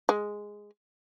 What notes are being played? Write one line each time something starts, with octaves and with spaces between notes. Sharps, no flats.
G#3